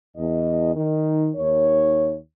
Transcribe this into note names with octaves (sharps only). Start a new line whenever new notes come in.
E2 D#5
D#3
D#2 D#3 C#5